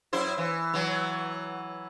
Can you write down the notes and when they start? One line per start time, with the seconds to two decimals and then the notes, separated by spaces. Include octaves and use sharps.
0.13 F#2 E4 C5
0.38 E3
0.74 E3 F#3